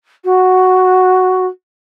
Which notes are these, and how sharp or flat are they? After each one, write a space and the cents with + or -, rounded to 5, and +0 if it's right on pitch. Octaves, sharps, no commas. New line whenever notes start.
F#4 +0